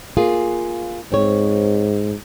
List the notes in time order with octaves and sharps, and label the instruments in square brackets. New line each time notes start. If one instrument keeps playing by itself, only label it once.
[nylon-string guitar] A#3 F4 G#4
[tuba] G#2 [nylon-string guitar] C4 C#5